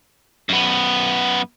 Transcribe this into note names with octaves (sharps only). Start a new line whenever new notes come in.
F#2 B3